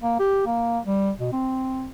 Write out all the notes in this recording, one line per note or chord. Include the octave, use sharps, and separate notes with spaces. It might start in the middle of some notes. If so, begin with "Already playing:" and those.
A#3
G4
A#3
G3
B2
C4